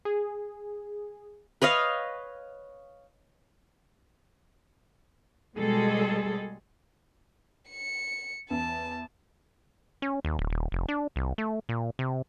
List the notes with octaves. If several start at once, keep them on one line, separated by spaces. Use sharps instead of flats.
G#4
B4 C#5 D#5 F5
B2 G3 G#3 G#4 A4
C#7
E2 A5
C#4
D#2
D1
D#1
F1
D4
C2
A3
A#2
C3